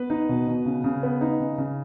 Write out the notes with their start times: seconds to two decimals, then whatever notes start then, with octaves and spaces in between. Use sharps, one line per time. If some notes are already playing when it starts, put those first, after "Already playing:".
Already playing: B3 B4
0.10 D#4
0.29 B2
0.47 B2
0.66 C#3
0.84 C#3
1.03 B3
1.21 D#4
1.40 C#3
1.58 C#3